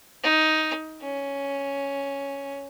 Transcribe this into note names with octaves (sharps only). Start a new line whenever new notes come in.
D#4
C#4